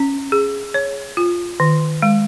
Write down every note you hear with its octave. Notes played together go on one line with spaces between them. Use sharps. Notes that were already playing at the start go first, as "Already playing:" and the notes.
Already playing: C#4
G#4
C#5
F4
D#3
G#3